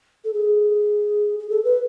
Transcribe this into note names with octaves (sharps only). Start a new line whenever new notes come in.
A4
G#4
G#4
A4
B4